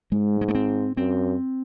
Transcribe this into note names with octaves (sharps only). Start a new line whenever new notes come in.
G#2 G#3
G#3
A3
C4
F#2 C4